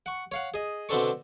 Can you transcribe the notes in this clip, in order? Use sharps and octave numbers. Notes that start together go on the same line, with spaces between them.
F#5 C#6
C#5 F5 F#5
G#4 D#5
B2 D3 C4 D4 A4 C#6